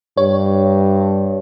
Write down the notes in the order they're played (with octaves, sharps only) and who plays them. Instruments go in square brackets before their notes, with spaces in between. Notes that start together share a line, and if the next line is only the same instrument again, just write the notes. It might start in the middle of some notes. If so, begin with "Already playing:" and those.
[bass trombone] G2 [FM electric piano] C#5